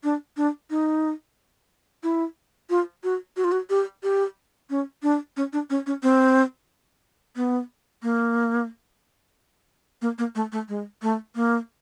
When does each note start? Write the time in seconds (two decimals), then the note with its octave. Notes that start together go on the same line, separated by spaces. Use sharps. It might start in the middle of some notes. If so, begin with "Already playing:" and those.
0.04 D4
0.37 D4
0.70 D#4
2.03 E4
2.70 F4
3.04 F#4
3.37 F#4
3.44 F4
3.52 F#4
3.70 G4
4.03 G4
4.70 C#4
5.03 D4
5.37 C#4
5.53 D4
5.70 C#4
5.86 C#4
6.03 C4
7.36 B3
8.03 A#3
10.02 A#3
10.18 A#3
10.35 A3
10.52 A3
10.69 G#3
11.02 A3
11.35 A#3